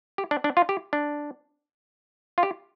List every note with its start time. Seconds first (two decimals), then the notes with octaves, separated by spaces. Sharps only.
0.18 G4
0.31 D4
0.44 D4
0.57 F4
0.69 G4
0.93 D4
2.38 F4
2.43 G4